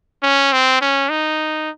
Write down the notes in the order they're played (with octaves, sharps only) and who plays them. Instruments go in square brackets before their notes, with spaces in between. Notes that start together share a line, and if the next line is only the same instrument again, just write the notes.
[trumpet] C#4
C4
C#4
D#4